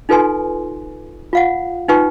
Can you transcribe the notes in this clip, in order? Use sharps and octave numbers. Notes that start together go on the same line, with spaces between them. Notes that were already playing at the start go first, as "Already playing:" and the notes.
D#4 F4 A4 B4 G#5 C6
F4 F5 F#5
D#4 F4 B4 G5 C#6